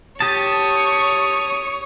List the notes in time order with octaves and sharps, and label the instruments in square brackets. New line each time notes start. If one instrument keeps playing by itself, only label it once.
[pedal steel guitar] G4 A5 [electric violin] C#5 [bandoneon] D#6